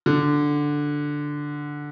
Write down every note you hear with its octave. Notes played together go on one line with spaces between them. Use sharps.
D3